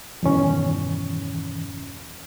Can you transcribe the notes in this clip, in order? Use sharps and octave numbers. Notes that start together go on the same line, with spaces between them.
E2 G2 B2 D#3 E3 C#4